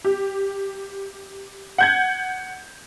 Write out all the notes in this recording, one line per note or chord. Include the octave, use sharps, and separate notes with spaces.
G4
F#5 G6 G#6